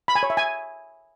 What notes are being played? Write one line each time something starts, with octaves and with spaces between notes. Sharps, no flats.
B5
G#5
C#5
E5
G#5